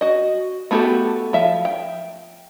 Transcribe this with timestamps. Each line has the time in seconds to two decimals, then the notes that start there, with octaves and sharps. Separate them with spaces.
0.01 F#4 D#5
0.71 A3 B3 F#4 G4 A4
1.33 F3 E5 F5
1.65 G5